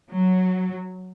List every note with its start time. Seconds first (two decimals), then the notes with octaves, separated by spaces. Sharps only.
0.10 F#3